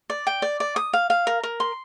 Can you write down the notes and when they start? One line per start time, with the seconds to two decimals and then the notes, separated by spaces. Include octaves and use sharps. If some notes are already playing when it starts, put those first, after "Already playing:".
0.10 D5
0.27 G5
0.42 D5
0.60 D5
0.76 D#6
0.93 F5
1.10 F5
1.27 A#4
1.43 A#4
1.60 C6